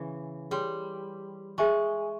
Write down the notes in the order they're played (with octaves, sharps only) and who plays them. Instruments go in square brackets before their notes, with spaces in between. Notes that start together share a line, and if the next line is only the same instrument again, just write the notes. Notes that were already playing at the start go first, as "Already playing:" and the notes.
Already playing: [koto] C#3 E3
[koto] G3 [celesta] G#4 C#5 G5 C6
[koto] G#3 [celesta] G#4 E5 G#5 C#6